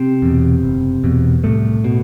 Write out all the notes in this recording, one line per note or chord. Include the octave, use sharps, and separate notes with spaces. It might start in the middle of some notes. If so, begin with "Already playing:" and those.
Already playing: C3 C4
E2 B2
F#1
E2 B2
C2 A2 A3
B2